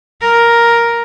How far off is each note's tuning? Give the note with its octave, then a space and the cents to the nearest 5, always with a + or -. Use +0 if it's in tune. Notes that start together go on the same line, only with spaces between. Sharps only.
A#4 +5